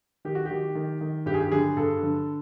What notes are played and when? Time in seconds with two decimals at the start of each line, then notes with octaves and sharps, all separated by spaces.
0.25 D#3 G4
0.35 F#4
0.46 G4
0.51 D#3
0.75 D#3
1.01 D#3
1.26 G2 G4
1.34 G#4
1.41 G4
1.52 D3 G#4
1.77 G2 A4
2.03 D3